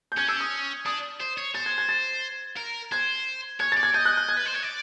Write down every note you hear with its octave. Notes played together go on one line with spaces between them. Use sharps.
G6
C#4 G#6
D4 E6
C#4 D#6
D4 D#6
C5
C#5
C5 A6
G#6
G#6
A6
A#4
C5 G#6
C#5 G#6
A6
D5
G#6
D#5 G6
F#6
F#6
G#6
B4
C5
C#5
D5